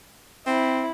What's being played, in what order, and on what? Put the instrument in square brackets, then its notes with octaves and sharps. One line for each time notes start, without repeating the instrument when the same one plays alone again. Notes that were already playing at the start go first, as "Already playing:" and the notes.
[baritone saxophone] C4 [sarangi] E4